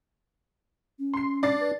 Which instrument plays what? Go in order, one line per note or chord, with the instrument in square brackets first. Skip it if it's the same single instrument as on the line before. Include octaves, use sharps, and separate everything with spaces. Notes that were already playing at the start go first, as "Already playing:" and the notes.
[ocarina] C#4
[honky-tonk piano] C6 C7
[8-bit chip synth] D4 [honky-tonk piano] D5 A6 C7
[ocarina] B4